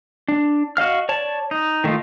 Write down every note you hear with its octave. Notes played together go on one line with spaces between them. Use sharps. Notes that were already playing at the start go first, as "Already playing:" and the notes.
D4
F#4 D#5 F5 F6
C#5 D5 A5
D#4
D#3 A3 D#4 F4